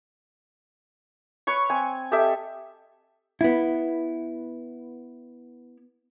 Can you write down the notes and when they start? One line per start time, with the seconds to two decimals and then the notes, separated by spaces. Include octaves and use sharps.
1.47 B4 C#5 C#6
1.70 C4 G#5
2.12 G4 A4 D#5 E5
3.41 B3 E4